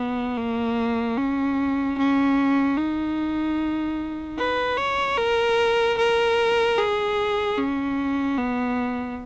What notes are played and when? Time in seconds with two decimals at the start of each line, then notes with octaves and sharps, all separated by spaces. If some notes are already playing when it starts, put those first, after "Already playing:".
Already playing: B3
0.37 A#3
1.18 C#4
1.98 C#4
2.78 D#4
4.38 B4
4.77 C#5
5.18 A#4
5.98 A#4
6.78 G#4
7.58 C#4
8.38 B3